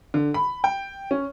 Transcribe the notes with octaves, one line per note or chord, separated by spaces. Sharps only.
D3
B5
G5
C#4